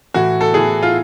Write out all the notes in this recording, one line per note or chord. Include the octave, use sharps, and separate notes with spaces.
A2 E3 F#4
A4
A2 E3 G#4
F4